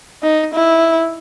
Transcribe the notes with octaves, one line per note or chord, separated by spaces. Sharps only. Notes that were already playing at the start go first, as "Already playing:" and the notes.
D#4
E4